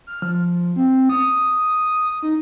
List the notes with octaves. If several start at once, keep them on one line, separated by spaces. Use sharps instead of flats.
F6
F3
C4
D#6
D#4